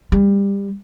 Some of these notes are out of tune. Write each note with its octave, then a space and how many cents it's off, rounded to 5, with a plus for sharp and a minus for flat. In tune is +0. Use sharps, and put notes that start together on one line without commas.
G3 +25